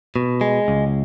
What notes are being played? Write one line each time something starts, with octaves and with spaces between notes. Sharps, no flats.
B2
G#3
C#2